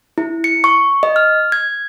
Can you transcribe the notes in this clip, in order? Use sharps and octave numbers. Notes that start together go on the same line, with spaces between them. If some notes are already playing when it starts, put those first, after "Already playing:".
E4
C#7
C#6
D#5
F6
G#6